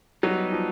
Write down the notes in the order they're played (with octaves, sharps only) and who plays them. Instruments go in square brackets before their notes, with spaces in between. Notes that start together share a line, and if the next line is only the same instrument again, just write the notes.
[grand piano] F#3 [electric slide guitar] G3 B3 D#4
[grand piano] F3